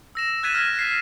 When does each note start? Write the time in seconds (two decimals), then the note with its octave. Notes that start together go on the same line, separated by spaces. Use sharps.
0.15 E6 A#6 E7
0.43 F#6 G#6 A6 B6 D#7 E7
0.55 F6
0.79 C7